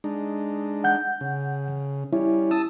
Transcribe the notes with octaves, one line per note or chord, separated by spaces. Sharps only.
G#3 D4 D#4
F#5 G6
C#3
G3 C#4 E4
A5 D#6 E6